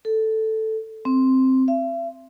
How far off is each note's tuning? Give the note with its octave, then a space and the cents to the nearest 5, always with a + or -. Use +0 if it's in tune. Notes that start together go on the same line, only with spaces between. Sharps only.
A4 +0
C4 +0
E5 +45